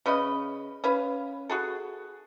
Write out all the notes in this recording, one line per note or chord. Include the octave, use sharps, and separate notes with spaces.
C#3 C#4 B4 D#5
C#4 B4 F5
F#4 G#4 A4